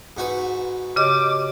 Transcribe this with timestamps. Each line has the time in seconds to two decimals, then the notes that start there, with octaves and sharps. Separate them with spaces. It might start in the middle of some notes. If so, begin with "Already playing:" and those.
0.17 G#2 F#4 B4
0.96 C#3 G4 D#5 D6